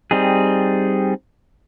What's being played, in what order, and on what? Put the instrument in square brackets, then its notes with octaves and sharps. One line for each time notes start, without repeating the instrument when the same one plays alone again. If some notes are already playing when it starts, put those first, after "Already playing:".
[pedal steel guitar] G3 C4 D#4 G#4